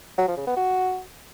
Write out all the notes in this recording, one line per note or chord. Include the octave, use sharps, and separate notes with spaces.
F#3
F3
C#3
B3
F#4